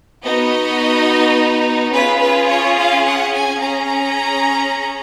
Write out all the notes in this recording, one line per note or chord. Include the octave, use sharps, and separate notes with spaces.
B3 D#4 F#4 D#5
C#4 F4 G#4 B4
B4
C#5
F5
F#5
G#5
C#4 G#4 A#5